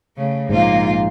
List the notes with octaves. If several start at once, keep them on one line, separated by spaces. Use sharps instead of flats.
C#3 A3
A#1 G#2 A#3 F4